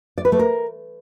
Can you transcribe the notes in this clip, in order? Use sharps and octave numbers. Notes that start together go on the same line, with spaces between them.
D5
B4
A3
A#4